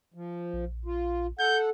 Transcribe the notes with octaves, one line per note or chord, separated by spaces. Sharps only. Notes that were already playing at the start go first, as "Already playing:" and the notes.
F3
A#1
F4
A4 F#5 G6